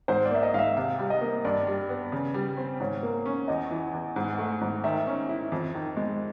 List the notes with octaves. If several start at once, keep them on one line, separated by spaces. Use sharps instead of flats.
G#2 C5
D5
A#3 E5
D#5
G#2 E5 F5
C3 F5
G3
D#5
A#3
G2 D5
G3
B3
C#3
G3
C4
G#2 C#5
A#3
C#4
E2 D#5
E3
E2
G#2
A3
G#2
D#3 E5
C#4
E4
F2
D#3
G#3